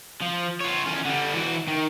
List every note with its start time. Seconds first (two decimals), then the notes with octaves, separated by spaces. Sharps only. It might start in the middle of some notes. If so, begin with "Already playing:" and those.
0.21 F3
0.61 F4 C#5
0.87 E2 C#4
1.05 D3 G3
1.34 E3 F#4
1.68 D#3